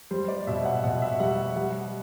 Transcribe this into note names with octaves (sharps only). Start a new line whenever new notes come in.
G3 C5
D5
B2 E5
F#5
B2 F#5
E5
G3 F#5
G3 F#5